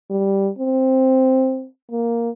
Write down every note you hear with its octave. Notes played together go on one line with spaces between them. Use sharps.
G3
C4
A#3